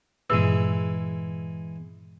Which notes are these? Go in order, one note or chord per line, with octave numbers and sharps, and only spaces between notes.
G2 A#2 E3 G#3 E6